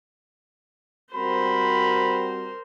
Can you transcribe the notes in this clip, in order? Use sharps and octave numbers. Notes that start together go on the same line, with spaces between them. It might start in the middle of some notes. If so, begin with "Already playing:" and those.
G3 C4 F#4 A#4 C5 B5